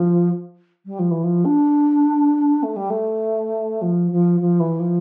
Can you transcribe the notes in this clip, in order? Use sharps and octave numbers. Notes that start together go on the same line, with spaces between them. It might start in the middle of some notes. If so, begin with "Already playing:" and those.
Already playing: F3
G3
F3
E3
F3
D4
A3
G3
A3
F3
F3
F3
E3
F3